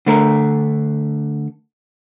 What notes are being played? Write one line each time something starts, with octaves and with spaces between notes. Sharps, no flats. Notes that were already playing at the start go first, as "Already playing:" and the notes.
D3 A3 A#4